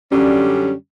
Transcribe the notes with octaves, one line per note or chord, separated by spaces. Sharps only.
F#2 D3 G3 C#4